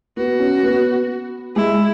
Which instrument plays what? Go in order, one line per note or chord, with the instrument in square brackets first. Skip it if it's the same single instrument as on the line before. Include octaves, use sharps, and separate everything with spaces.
[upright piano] B3 [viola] F#4
[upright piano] C#4
B3
[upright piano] G#3 [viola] E4